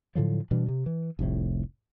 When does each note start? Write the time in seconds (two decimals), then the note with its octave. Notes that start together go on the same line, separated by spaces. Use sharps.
0.15 A2 D3 F3 F#3
0.51 B2 E3 G3 D4
0.68 C3
0.86 E3
1.19 F1 C2 F2 A2